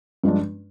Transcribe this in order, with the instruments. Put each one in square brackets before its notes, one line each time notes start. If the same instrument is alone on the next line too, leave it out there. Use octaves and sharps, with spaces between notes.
[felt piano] G2 F3 G#3 D4